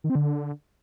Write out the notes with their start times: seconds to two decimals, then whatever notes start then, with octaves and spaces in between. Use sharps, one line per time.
0.04 D#3
0.10 C4
0.15 D3